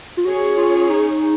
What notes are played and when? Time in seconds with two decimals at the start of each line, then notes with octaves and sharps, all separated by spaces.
0.17 F4
0.25 C#4 F#4 G#4 C#5
0.57 F4
0.89 D#4